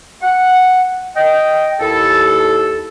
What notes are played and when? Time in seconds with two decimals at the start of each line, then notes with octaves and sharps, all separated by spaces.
0.21 F#5
1.16 D#5 G5
1.80 D#2 E4 A4